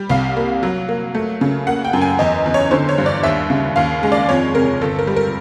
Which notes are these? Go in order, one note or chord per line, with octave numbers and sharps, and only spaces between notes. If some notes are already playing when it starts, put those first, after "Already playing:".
Already playing: G3
C2 F5
A#3
F#3
A#3
A3
C#3
A#3 F#5
G5
F#2
G#5
E2 D#5
E2
C#5
D3 C5
C#5
G2
D5
D#2 E5
C#3
D#2 F5
G#3
D5
F2 C#5
C3 A#4
G1 A4
A#4
G3
A#4